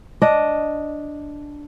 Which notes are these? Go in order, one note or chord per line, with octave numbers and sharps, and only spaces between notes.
D4 D#5